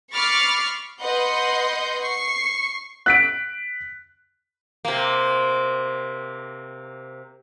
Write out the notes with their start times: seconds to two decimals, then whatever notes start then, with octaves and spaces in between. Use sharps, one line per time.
0.12 B5 C#6 D6 F6 A6 C7
1.01 B4 D#5 F#5 C6 G6
2.02 C#6 C7
3.06 F#6 B6 D7
4.85 C3 A#3